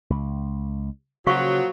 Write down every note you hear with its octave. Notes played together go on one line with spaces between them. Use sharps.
C#2
A#2 C#3 F3 F#3 F#4 F5 C#6